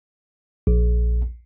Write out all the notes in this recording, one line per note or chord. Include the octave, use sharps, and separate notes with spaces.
A#1